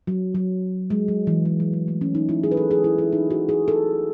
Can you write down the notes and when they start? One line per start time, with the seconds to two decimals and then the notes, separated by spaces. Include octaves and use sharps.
0.07 F#3
0.35 F#3
0.90 G#3
1.08 F#3
1.27 E3
1.45 G#3
1.60 F#3
1.73 G#3
1.88 A3
2.01 C#4
2.15 D#4
2.29 E4
2.44 G#4
2.51 B4
2.57 A4
2.71 G#4
2.84 E4
2.98 E4
3.13 D#4
3.31 F#4
3.49 G#4
3.68 A4